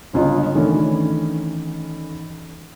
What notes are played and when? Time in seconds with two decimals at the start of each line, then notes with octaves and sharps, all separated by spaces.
0.13 G1 C#2 F4 D#5
0.54 D#3 E3 A3 C#4 D4